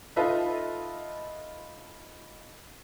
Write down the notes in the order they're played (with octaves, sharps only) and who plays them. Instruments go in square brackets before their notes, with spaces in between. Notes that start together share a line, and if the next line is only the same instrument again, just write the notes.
[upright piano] D#4 F4 A4 B4 D#5 E5